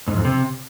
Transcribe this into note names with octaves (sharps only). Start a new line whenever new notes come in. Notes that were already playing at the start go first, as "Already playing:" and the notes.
G#2
F2
C3